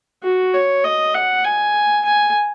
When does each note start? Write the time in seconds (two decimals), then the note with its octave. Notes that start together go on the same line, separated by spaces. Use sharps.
0.23 F#4
0.54 C#5
0.84 D#5
1.14 F#5
1.44 G#5
2.05 G#5